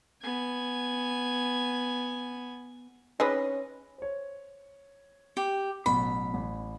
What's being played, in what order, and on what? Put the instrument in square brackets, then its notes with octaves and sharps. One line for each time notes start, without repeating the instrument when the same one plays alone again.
[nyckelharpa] B3 G#5
[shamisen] C4 D#4 G#4 [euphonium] C#4 [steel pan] B4 D#5
[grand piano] C5 C#5
[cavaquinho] G4
[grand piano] A1 B2 F#3 [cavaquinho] B5
[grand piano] A1